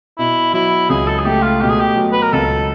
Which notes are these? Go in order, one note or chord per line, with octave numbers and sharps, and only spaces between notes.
B2 E4
F#3 E4
C#2 G#4
A4
G#4
A3 G4
F4
B2 G4
G#4
G4
F#3
B4
A#4
C#2 A4